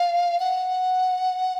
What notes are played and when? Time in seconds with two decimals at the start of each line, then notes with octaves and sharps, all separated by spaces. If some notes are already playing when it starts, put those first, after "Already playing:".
Already playing: F5
0.40 F#5